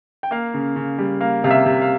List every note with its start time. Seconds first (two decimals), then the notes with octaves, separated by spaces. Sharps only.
0.23 G5
0.31 A#3 F5
0.54 C#3
0.76 C#3
0.98 G3
1.21 A#3 F5
1.44 C3 F5
1.51 E5
1.66 C3
1.82 F5